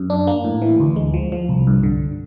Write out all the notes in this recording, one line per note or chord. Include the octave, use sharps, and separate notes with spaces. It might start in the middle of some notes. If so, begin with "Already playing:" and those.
Already playing: F#2
D4
A#3
A2
E3
D2
G#3
F3
F3
C2
G2
D3